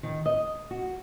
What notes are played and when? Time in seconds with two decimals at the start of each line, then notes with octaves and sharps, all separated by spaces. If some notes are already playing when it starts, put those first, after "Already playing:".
0.03 D#3
0.26 D#5
0.71 F#4